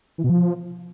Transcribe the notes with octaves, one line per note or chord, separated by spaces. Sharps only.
E3
B2
F3